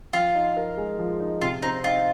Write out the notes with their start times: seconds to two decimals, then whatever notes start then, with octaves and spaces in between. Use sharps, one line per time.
0.13 F3 F4
0.35 D#4
0.57 A#4
0.77 G#3
0.99 F3
1.20 D#4
1.42 C3 F4
1.62 C4 D#4
1.84 D#4 F4